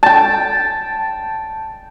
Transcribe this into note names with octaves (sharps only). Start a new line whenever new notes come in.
G5 A5